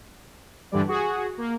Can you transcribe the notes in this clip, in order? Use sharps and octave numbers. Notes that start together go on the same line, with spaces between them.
G2 D3 E3 G3 D5
F#4 G#4
A#3